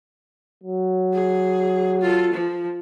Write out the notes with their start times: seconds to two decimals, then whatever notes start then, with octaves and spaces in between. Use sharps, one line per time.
0.64 F#3
1.13 G#4
2.01 F4 A4
2.33 F3